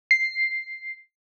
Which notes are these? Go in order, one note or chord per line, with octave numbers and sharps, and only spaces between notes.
C7